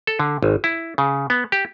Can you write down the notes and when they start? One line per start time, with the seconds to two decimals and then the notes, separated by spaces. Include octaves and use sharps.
0.07 A4
0.19 D3
0.43 G#1
0.64 E4
0.98 C#3
1.30 B3
1.52 G4